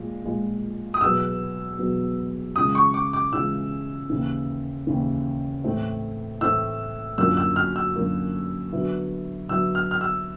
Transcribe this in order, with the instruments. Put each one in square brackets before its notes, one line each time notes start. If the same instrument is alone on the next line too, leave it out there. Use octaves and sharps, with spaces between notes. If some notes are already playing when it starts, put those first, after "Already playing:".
Already playing: [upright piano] A#2 F3 G#3
A#2 F3 G#3
[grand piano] D#6
[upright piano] E2 B2 F#3 B3 [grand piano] E6
[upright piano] E2 B2 F#3 B3
[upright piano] C#3 E3 G#3 C#4 F4 [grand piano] D#6
[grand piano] C#6
D6
D6
[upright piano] C#3 E3 G#3 C#4 F4 [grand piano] E6
[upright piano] D#2 C#3 E3
D#2 C#3 E3
A2 E3 A3 C4
[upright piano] A2 E3 A3 C4 [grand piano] E6
[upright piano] F#2 D3 F3 A#3 [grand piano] E6
[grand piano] E6
F6
E6
[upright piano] F#2 D3 F3 A#3
D3 F#3 B3 E4
[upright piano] D3 F#3 B3 E4 [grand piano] E6
[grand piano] F6
F6
E6